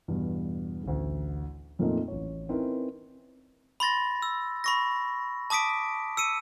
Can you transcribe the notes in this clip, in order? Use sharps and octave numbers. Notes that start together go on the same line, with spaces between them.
E2 G2 B2
A1 D2
F2 A#2 A3 A#3 C4 D#4
A1 C#5
C4 C#4 D#4 E4 A#4 B4
B5 C6 A6 A#6
E6
B5 C#6 A#6
A5 D6 D#6 B6 D7
E6 C#7 D#7